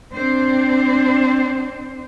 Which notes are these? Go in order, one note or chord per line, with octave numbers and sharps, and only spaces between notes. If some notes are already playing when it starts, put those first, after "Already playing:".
C4 D4 C5